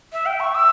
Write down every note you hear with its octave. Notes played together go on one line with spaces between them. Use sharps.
E5
G5
C#6
E6